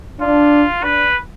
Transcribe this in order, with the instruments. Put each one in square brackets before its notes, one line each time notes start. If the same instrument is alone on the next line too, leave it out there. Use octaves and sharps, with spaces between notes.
[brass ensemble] D4 [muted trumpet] F4
[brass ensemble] D4 [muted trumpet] B4